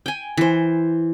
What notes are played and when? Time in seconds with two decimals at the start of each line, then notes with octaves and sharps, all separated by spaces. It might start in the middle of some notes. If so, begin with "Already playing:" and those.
0.06 G5 G#5
0.37 E3 C5